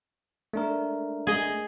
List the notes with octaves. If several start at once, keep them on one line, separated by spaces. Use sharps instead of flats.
A3 D4 A#4
G#4 D#5